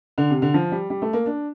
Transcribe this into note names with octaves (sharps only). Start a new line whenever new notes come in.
D3
C3
D3
F3
G3
G3
A3
A#3
D4